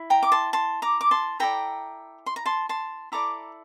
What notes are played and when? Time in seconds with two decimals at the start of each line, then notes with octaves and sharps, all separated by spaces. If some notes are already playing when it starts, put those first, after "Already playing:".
Already playing: E4
0.10 G5 A#5
0.23 D6
0.32 A5 C6
0.53 A5 C6
0.82 A#5 D6
1.01 D6
1.11 A5 C6
1.40 E4 A4 D5 G5 A#5
2.26 C6
2.36 A#5
2.45 A5 C6
2.69 A5 C6
3.12 E4 A4 D5 A#5 D6